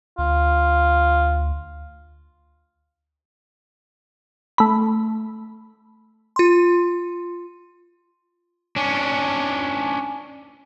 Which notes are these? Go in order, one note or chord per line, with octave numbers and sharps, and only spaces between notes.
D2 F4
A3 B5
F4 C6
C#4 D4